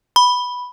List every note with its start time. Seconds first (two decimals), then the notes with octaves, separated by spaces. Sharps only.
0.16 B5